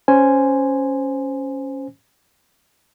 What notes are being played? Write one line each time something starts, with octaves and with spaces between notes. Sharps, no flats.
C#4 C5 G#5